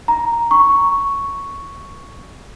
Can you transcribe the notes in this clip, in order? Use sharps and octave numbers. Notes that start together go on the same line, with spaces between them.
A#5
C#6